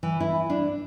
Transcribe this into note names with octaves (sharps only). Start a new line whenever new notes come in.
E3
E4
D4